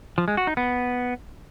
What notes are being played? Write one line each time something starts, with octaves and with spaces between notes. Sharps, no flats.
F3
G#3
F#4
D#4
B3